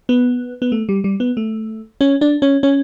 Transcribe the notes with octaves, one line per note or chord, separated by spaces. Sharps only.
B3
B3
A3
G3
G3
B3
A3
C#4
D4
C#4
C#4